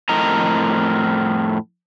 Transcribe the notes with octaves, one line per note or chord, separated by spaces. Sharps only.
F2 A2 A#4 D#5 A#5